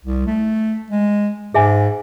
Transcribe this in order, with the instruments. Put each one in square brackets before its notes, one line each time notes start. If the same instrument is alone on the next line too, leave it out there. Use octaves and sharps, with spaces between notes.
[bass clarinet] C2
A3
G#3
[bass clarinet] G#2 [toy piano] G#4 E5 G#5